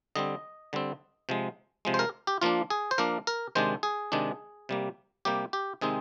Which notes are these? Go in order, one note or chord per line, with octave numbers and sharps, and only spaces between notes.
D3 G3 C4 D#5
D3 G3 C4
C3 F3 G#3
C3 F3 G#3
C5
A#4
G4
F3 A#3 D4 F4
G#4
C5
F3 A#3 D4 A#4
A#4
C3 D#3 G#3 D4 C5
G#4
C3 D#3 G#3 D4
C3 G3 A#3
C3 G3 A#3 G4
G4
C3 D#3 G#3 C4 D#4 G#4